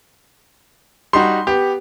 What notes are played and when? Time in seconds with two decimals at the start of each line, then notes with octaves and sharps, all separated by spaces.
1.13 G3 D#4 F#4 C6
1.47 B3 G4